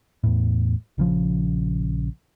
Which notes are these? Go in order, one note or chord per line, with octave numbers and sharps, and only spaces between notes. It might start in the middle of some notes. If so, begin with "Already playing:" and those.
E2 A2
A#1 C#3 F3